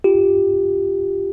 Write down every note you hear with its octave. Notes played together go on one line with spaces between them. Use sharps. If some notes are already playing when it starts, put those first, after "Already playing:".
F4 G4